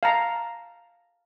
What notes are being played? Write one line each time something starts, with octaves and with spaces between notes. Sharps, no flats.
F5 A5 A#5